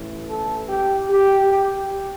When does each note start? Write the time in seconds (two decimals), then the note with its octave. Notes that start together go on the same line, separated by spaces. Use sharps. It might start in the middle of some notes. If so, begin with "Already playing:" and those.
Already playing: A1 A2 E3
0.27 A4
0.68 G4
1.09 G4
1.49 G4